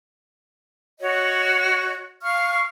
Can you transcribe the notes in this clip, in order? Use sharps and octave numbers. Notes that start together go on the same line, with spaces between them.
F#4 C#5 D#5
F5 C#6 F6